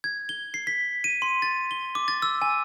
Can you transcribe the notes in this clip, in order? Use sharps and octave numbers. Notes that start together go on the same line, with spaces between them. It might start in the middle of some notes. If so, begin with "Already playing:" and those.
G#6
G7
C7
B6
D#7
C6
A6
G7
D6
A6
E6
G#5